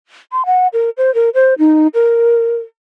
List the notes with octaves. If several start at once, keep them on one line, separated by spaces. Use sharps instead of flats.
C6
F#5
A#4
C5
A#4
C5
D#4
A#4